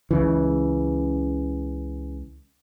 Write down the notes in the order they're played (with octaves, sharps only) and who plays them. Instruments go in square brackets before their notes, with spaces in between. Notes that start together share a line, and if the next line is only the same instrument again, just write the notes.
[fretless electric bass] C#2 C#3 E3